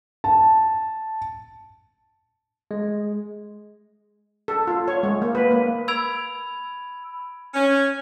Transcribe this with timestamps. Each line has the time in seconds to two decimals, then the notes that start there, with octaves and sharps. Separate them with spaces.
0.24 A5
2.71 G#3
4.48 A4
4.67 F4
4.88 C#5
5.03 G#3
5.22 A#3
5.35 B4
5.51 A#3
5.88 B5 E6 G#6 D7 F7
7.54 C#4